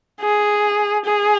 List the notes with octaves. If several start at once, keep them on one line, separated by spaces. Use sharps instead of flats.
G#4
G#4